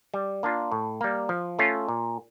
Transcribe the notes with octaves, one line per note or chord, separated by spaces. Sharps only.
G3
A#3 D4 F4
A2
G3 A#3
F3
A3 C#4 F4
A#2